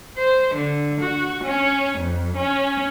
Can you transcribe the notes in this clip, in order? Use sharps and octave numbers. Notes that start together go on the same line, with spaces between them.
C5
D3
F#4
C#4
F2
C#4